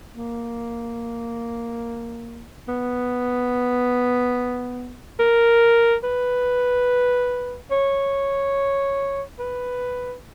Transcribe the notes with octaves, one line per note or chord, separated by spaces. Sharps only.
A#3
B3
A#4
B4
C#5
B4